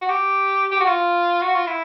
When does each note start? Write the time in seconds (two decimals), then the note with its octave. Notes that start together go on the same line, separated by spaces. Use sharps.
0.01 F#4
0.09 G4
0.71 G4
0.80 F#4
0.87 F4
1.42 F#4
1.55 F4
1.67 E4